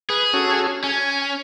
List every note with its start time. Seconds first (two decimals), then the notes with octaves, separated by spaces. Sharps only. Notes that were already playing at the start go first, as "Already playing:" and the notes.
0.10 G#4 B4
0.33 C#4 F#4 A4
0.84 C#4 G#5